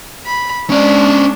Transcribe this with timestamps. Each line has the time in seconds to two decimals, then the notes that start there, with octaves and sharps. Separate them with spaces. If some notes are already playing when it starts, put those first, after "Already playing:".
0.25 B5
0.70 G#3 C#4 D4 D5